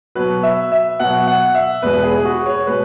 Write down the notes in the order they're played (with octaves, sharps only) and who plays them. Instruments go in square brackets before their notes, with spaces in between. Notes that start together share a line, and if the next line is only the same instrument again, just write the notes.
[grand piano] B2 F#3 B4
E5
E5
B2 F#3 F#5
F#5
E5
E2 B2 G#3 B4
G#4
F#4
C#5
B2 G#3 B4